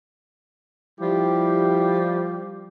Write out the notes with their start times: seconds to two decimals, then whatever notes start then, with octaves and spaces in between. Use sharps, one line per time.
1.00 F3 G3 E4 G4